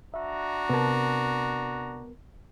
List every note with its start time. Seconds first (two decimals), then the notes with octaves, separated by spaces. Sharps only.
0.14 D4 F#4 E5 A#5
0.70 C3 B3 A#4 A5